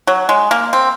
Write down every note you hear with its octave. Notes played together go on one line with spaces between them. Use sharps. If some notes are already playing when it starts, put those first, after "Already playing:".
F#3
G#3
A#3
C4